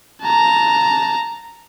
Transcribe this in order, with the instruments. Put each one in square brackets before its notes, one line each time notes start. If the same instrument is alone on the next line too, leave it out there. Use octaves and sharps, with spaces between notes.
[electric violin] A5 A#5